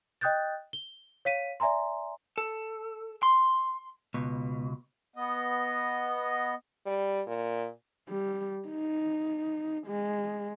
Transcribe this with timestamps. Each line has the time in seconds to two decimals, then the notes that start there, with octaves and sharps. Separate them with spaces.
0.21 D#5 G5 D#6 F#6 G6 A6
0.73 G7
1.25 C#5 F5 B6 D#7
1.60 D5 E5 G#5 A#5 C6
2.38 A4
3.23 C6
4.14 C#2 B2
5.16 B3 D#5
6.86 G3
7.27 A#2
8.09 G3
8.68 D#4
9.87 G#3